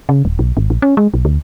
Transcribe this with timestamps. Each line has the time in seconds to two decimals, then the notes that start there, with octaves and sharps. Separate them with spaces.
0.09 C#3
0.25 D#1
0.39 B1
0.57 G#1
0.70 A#1
0.82 C#4
0.97 G#3
1.14 B1
1.25 D2